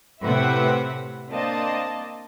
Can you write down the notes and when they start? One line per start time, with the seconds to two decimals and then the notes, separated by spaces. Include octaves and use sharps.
0.22 A2 C3 C4 B4 E5 F#5
1.29 A#3 C4 D4 D#5 A5